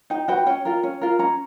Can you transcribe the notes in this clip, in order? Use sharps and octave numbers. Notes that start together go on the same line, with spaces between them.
D#4 G5
F#4 B4 G5
C#4 G5
F4 A#4
C#4
F4 A#4
C#4 A#5